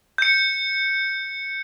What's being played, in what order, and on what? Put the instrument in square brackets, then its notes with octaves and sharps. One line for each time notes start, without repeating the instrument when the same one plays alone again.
[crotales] G6 C#7